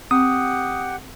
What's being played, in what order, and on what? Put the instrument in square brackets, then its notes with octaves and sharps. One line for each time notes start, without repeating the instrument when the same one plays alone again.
[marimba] C4 [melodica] G4 F#5 [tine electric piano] D#6